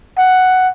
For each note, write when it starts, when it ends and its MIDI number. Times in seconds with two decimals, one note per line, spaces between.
0.18 0.69 78